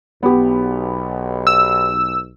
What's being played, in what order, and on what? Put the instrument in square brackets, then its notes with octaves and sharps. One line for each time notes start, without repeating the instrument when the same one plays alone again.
[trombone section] B1 [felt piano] B3 G4
[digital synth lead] E6